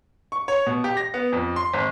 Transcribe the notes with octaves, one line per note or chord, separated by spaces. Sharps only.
C#6
C#5
B2
G4
A#6
B3
F2
C6
G#1